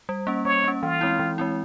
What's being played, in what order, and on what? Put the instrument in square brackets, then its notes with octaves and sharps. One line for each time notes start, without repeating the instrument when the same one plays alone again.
[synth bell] G3
A#3 C#4
[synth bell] G3 [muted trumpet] C#5
[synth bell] A#3 C#4
[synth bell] E3 [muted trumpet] F4
[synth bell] G#3 C4 E4
E3
G#3 C4 E4